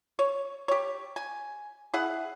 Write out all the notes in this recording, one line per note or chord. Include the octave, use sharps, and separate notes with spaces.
C#5
G4 C#5
G#5
E4 G#4 F#5